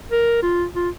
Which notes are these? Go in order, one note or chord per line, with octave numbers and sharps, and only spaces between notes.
A#4
F4
F4